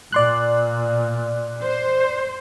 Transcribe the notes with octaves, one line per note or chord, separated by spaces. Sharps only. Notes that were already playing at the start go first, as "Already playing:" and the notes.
A#2 D5 C6 F#6
C5